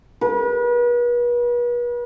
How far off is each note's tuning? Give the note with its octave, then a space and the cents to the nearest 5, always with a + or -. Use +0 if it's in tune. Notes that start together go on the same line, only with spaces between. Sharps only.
B4 -40